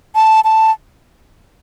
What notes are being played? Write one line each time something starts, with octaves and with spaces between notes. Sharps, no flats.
A5
A5